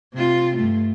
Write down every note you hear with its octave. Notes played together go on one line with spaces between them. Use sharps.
C3 F4
G2 A3